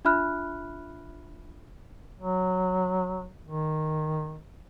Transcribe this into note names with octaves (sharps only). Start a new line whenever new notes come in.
D4 F4 E5 B5 F6 F#6
F#3
D#3